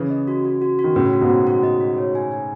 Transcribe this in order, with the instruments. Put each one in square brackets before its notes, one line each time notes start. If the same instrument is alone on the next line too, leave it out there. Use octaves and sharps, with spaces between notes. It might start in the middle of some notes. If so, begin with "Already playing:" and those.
Already playing: [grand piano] C#3 E3
[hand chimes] D#5
F#4
F#4
F#4
F#4
[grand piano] D#3
[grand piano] A2 C#3 [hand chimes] B4
[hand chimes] F#4
[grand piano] G#2 B2
[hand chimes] F#4
F#4
D#5
F#4
C#5
G#5
G#5